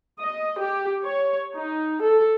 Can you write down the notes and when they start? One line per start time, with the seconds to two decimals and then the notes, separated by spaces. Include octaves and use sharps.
0.19 D#5
0.58 G4
1.06 C#5
1.55 D#4
2.02 A4